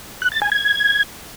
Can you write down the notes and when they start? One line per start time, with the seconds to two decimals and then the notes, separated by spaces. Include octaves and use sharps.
0.22 F#6
0.32 A6
0.42 G#5
0.52 G#6